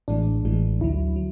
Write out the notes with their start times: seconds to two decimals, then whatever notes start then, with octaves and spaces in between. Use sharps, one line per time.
0.08 A1 A2 E3 G#3 D4
0.44 A1 A2 E3 G#3
0.80 D2 D3 F#3 E4
1.16 F#3